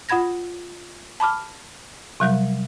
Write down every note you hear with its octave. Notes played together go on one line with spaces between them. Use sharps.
F4 F#5 B5 G#6 A#6
A5 B5 D6 F6
C3 F#3 G3